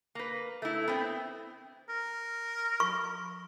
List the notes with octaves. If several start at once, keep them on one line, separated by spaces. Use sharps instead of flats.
A#3 B4
A3 E4
B3 C4
A#4
C#6